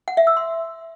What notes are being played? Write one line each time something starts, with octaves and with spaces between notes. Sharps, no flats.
F#5
E5
E6
C6